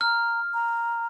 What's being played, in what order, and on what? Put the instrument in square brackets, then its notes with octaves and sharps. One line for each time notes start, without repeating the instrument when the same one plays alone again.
[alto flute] A#5 [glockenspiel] F6
[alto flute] A#5